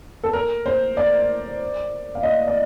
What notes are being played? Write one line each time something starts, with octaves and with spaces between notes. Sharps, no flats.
A4
A#4
C5
D5
F5
D#5
D5